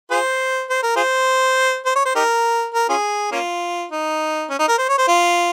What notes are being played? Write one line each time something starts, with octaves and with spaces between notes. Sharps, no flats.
F4 G#4 C5
C5
A#4
F4 G#4 C5
C5
C#5
C5
D#4 G4 A#4
A#4
C#4 F4 G#4
A#3 C#4 F4
D#4
C#4
D#4
A#4
C5
C#5
C5
F4